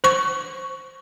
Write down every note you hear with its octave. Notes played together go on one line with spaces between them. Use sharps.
C5 C#6